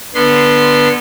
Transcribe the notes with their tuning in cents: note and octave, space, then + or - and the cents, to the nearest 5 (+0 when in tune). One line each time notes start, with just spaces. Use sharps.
D3 +5 B3 -20 C6 -20